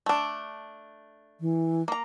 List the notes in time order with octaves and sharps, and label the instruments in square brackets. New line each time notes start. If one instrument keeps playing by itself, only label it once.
[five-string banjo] A3 D4
[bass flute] E3
[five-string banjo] A#3 A#5